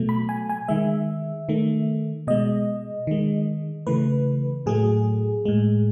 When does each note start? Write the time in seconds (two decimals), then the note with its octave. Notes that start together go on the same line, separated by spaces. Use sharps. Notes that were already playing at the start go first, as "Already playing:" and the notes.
Already playing: B2 F#3 A3
0.09 B5
0.29 G#5
0.49 G#5
0.68 D#3 G#3 E5
1.49 D#3 A3
2.27 B2 G#3 D#5
3.07 D#3 G#3
3.87 C#3 E3 A3 B4
4.66 A2 F#3 A3 G#4
5.45 A2 G#3